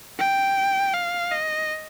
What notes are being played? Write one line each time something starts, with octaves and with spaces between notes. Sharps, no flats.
G5
F5
D#5